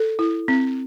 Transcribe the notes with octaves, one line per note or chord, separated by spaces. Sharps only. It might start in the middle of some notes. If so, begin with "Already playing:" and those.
Already playing: A4
E4
C4